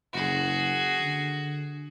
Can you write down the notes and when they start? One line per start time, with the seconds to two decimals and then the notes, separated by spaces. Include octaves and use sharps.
0.13 F#1 F#4 G#4
1.01 D3